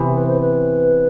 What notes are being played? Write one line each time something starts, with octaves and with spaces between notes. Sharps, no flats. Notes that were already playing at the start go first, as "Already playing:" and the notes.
Already playing: C3 E3 B3
B4
C5
B4